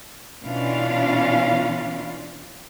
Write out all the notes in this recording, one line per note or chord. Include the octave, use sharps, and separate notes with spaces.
B2 E3 C#4 D4 F4 F5